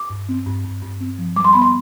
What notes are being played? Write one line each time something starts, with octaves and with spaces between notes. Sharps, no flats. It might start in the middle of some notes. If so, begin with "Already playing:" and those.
Already playing: D6
G2
C4
G2
G2
G2
C4
F3
G3 D6
C6
B3 B5
C6